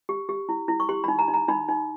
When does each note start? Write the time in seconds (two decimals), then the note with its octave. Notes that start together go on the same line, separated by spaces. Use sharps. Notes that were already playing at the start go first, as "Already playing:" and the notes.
0.09 G4
0.29 G4
0.49 E4
0.68 E4
0.80 C#6
0.89 G4 C6
1.04 B5
1.08 D#4
1.19 A#5
1.28 D#4
1.34 A#5
1.48 D#4 B5
1.69 D#4